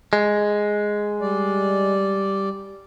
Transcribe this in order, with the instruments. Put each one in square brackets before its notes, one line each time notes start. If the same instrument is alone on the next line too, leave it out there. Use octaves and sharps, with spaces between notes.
[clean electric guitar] G#3
[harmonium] G3 D5